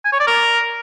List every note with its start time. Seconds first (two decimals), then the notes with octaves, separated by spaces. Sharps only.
0.05 G#5
0.12 C#5
0.20 D5
0.27 A#4